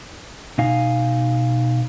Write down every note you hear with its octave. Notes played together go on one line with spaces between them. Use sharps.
B2 D#4 F5 G#5